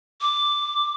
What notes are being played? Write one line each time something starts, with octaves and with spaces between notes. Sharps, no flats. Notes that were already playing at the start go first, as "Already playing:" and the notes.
D6